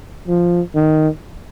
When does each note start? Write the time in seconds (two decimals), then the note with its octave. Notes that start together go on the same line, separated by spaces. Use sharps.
0.28 F3
0.75 D#3